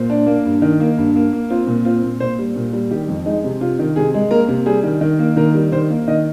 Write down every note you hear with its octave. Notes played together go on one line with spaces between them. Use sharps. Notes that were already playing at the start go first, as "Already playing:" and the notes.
Already playing: A#2 C5
D4
A#3
G2
D#3
A#3
G2
A#3
A#3
C4 F4
A#2
C4 F4
A#2
A#2 C5
G3
A#2
G3
D#3 G4
F2
G#3 D#4
C3
C3 F4
D#3
C3 G#4
G#3
A#3 A#4
C3
G3 G#4
D#3
D#3
A#3
D#3 A#4
G3
D#3 C5
A#3
D#3 D#5